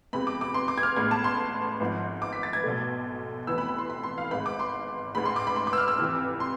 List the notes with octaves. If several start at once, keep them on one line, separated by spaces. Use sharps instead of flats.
F2 C3 G#3 B3 B5
D6
D6
C6
D6
G#6
F6
A1 A2 G#3 B3 G#6
A5
C6
G#1 G#2 F3
D6
B6
A6
G#6
B1 B2 A3
F1 F2 E3 B3 E6
B5
B5
C6
B5
C6
F5
G#1 G#2 G#3 B5
D6
C6
A1 G#2 G#3 B5
C6
D6
B5
C6
D6
E6
F6
E6
F2 C3 E3
C6